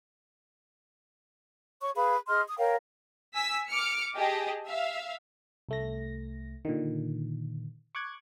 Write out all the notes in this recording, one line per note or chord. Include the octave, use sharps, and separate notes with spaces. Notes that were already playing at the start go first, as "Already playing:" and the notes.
C#5 C#6
G#4 B4 F5 B5
G#4 D#5 C6 F6
D#6
A#4 C#5 F5 G5
G#5 E6 B6
D6 F6 C#7
G4 G#4 D#5 A5
E5 F5
C2 A3 A#6
A#2 D3 D#3
C#6 D6 F#6 G#6